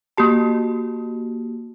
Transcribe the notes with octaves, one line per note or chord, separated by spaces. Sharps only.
A#3 F#4 G4 A5